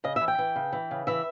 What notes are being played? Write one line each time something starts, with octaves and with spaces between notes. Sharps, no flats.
C#3 D#5
E3 E5
G5
E3
C#3
E3
C#3
E3 E5